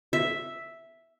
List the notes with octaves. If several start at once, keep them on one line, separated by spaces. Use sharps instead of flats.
E5